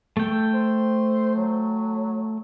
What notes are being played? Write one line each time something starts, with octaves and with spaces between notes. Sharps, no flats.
A3 G5
C5
F#3